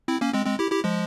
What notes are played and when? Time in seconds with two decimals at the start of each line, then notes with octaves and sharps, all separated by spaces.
0.08 C4 E4
0.21 A#3 C#4
0.33 G#3 C4
0.46 G#3 C4
0.59 E4 G4
0.71 E4 G4
0.84 F3 G#3